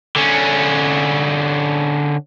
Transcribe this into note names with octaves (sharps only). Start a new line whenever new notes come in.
D3 C#4